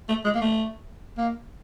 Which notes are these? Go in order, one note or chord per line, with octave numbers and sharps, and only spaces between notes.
A3
G#3
A#3
A3
A#3